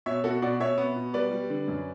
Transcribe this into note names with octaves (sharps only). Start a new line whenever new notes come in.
B2 C#5 E5
B2 F#4 A4
B2 D5 F#5
B2 C#5 E5
B3
B2
G3 B4 D5
G3
D3
F#2